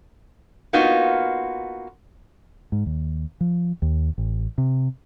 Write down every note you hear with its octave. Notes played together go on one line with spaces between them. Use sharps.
A#3 B3 D#4 F4 F#4
G#2
D#2
F3
D#2
A1
C3